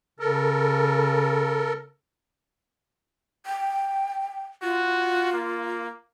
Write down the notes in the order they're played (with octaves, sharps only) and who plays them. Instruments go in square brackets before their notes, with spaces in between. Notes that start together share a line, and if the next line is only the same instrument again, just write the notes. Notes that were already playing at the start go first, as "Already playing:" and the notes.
[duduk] C#3 [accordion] A4 A#4
[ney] G5
[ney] F4 [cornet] F#4
[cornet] A#3